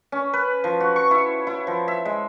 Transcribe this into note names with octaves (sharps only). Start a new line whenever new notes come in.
C#4
B4
F3
F#4
C#6
E4
E4
F3
E5
G#3